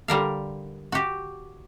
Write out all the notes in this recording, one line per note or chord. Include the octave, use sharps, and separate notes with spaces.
D3 G3 A#4 F5
F#4 G4